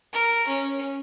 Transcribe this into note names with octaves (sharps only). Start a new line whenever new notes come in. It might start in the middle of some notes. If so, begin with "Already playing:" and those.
A#4
C#4